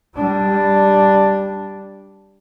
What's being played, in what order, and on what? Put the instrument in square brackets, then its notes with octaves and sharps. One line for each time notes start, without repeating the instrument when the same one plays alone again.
[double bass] G3 D4